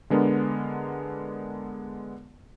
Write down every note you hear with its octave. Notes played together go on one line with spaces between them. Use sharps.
D3 G#3 B3 D4 A#4